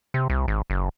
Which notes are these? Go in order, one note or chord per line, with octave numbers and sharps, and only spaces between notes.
C3
C2
G#1
F#1